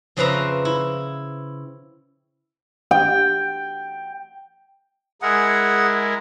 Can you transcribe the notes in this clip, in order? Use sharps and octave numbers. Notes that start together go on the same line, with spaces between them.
F2 C#3 C4 B4 E5 A#5
E4
G5
G#3 E4 G#4 A#4 F#5